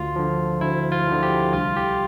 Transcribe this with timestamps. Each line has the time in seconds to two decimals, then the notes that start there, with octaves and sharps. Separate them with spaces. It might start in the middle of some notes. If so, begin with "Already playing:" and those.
Already playing: D2 F4
0.16 D3 F3
0.61 D2 E4
0.92 F4
1.07 D3 F3
1.23 G4
1.53 C2 F4
1.77 G4